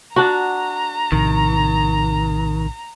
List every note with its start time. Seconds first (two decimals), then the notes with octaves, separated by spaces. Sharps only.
0.16 D4 F#4 A#5
1.12 A#1 A2 C3 D#3